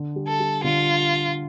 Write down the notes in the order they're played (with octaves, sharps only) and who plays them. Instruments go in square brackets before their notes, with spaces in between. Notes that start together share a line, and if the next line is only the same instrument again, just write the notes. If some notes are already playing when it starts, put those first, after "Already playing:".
Already playing: [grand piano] D3
G3
[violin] A4
[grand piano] G3
[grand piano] D3 [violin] F4